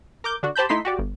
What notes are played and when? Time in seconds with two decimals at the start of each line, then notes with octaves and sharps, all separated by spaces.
0.24 A#4 D6 G6
0.43 D3 D4 F#4
0.56 G4 C5 A5 B5 G6
0.69 A3 D#4 E4 C6 B6
0.85 F#4 G4 D5
0.99 G1